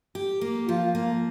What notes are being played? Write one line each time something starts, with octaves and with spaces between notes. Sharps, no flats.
G4
A#3
F3 F4
A#3